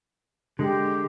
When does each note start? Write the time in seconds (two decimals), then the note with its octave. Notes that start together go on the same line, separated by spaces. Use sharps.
0.59 D3 G#3 G4